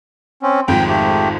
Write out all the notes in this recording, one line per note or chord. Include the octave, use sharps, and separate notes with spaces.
C4 C#4
G#1 F2 G#2 G5
A3 G4